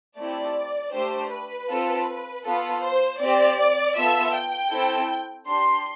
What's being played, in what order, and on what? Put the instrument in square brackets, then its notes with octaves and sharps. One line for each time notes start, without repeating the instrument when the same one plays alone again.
[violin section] A3 C4 E4 G4 D5
A3 D4 G4 C5
B4
C4 F4 A4
B3 F4 A4 B4
C5
C4 G4 D5
B3 F4 A4 E5
G5
C4 E4 A4
D4 G4 C6